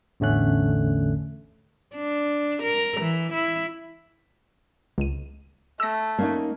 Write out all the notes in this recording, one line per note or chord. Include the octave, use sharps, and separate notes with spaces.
A1 E2 D3 A3 C#4 F#6
D4
A#4
E3
E4
C#2 D#7
A3 E6 A#6
A#3 C#4 D#4